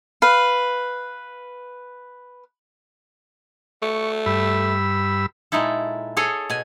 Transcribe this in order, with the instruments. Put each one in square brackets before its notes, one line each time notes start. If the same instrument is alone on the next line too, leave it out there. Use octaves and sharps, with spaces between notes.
[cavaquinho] B4 F5
[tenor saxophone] A3 [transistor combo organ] C#6
[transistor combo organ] G2 B5 E6
[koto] A#2 G#3 D#4 E4 A4
G#4 A4 C#5 D#5
B2 G#5